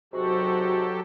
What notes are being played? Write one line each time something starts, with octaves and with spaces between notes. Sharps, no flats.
G#2 C3 F#3 F#4 G4 A4